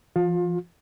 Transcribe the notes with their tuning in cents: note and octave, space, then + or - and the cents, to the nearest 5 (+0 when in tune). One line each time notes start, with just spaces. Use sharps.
F3 -40 F4 +25